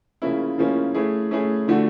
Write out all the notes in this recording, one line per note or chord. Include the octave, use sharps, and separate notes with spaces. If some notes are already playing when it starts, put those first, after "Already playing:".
C#3 F3 A#3 C#4 E4
C#3 F3 A#3 C#4 E4
A3 C#4 E4 G#4
A3 C#4 E4 G#4
D3 F3 A3 D4 F#4